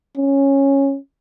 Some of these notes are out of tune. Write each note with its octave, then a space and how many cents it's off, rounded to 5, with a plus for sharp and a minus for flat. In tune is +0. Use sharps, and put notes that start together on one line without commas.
C#4 -10